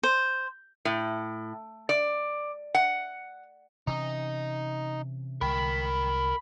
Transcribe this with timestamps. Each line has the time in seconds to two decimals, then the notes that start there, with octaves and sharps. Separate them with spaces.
0.03 C5
0.85 A2
1.89 D5
2.75 F#5
3.87 C3 E3 C#4 D#4
5.41 C2 G#3 A#4 G5 B5